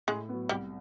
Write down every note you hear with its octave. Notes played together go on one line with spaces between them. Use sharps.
A2 G#3 G#4
F#3 B3
C2 G3 G4